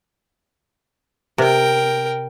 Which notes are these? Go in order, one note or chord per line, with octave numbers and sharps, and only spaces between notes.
C3 A#4 G5